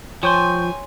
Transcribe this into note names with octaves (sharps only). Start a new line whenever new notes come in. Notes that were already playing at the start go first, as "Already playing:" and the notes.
F3 C#5 G5 G#5 C6 C#6 G6